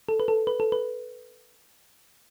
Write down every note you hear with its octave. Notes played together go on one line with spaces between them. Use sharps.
A4
B4
A4
B4
A4
B4